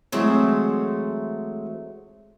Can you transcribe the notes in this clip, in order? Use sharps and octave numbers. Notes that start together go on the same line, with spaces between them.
E3 F#3 G#3 A3 C4 C#5